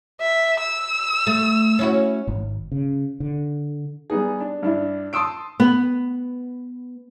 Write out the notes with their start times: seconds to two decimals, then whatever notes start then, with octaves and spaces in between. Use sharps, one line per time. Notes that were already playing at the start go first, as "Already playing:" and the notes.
0.21 E5
0.60 E6
1.27 A3
1.79 C#4 E4 F#4
2.28 G#1
2.72 C#3
3.20 D3
4.10 G3 B3 D#4 G#4
4.41 D4
4.63 G2 D4 E4
5.13 A5 C6 D#6 E6 D7
5.60 B3